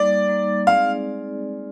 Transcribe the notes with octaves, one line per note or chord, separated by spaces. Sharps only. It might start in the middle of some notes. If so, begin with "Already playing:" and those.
Already playing: G3 A#3 D#4 D5
G3 A#3 D#4
G#3 C4 D#4 G#4 D5 F5